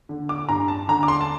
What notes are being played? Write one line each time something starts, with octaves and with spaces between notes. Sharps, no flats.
D3
D6
G2 A#5
A5
D3 A#5
D6
C6
A5